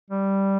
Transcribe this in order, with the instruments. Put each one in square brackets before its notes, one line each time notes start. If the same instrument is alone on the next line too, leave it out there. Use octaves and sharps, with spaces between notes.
[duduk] G3